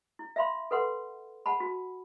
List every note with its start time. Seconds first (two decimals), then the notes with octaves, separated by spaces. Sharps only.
0.19 E4
0.36 E5 F5 B5 C6
0.71 A4 B4 F#5 C6
1.46 F#5 A5 B5
1.60 F#4